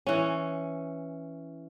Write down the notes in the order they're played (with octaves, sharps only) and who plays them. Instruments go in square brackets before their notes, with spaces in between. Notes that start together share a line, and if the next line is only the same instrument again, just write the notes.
[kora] E3 C#4